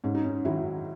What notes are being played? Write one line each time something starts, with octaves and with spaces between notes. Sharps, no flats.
G#2 C#4
D#4
C#4
D#3 F#3 E4